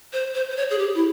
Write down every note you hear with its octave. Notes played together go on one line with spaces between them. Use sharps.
C5
C5
C5
C#5
G#4
G4
E4